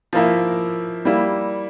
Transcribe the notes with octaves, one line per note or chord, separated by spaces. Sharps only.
F3 A#3 E4 A#4 E5
G3 A#3 E4